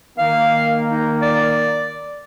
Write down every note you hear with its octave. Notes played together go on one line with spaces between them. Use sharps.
D#3 A#3 F5
D#4
D5